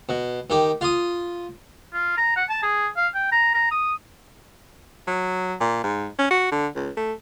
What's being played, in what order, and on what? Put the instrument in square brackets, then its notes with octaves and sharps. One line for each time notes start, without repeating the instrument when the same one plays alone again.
[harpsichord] B2
D#3 G4
F4 D#6
[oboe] F4
A#5
F#5
A5
G#4
F5
G5
A#5
A#5
D#6
[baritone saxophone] F#3
A#2
G#2
C#4
F#4
D3
C#2
A3